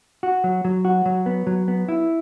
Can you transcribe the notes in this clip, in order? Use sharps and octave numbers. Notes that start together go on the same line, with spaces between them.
F#4
F#3
F#3
F#4
F#3
B3
F#3
B3
E4